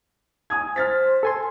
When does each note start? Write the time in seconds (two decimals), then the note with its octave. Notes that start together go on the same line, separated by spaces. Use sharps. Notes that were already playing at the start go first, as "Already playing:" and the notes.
0.50 G#5 D#6 G#6
0.76 C5 F6 A6 B6
1.23 A4 G#5 C6